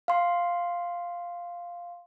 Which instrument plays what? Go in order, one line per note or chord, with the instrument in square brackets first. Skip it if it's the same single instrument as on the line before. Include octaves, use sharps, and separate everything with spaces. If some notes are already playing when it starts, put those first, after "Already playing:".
[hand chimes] F5 C6